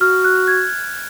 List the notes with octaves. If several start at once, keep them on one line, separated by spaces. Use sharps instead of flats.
F#4 F6
F#6
G#6